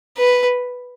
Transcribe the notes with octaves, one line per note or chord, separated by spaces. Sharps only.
B4